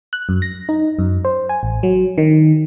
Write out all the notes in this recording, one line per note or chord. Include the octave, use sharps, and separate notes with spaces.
F#6
F#2
A#6
D#4
F#2
C5
G#5
A1
F#3
D#3